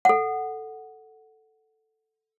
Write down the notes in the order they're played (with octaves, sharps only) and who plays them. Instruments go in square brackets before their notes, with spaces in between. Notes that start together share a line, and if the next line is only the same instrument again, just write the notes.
[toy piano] A4 F#5